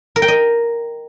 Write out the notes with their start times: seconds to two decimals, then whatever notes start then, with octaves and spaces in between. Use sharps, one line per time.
0.16 A#4
0.22 G5
0.28 D#5